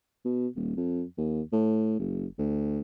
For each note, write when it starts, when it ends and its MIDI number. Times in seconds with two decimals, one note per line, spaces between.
0.25 0.48 47
0.56 0.75 27
0.77 1.03 41
1.18 1.41 39
1.52 1.97 45
1.99 2.26 30
2.38 2.81 38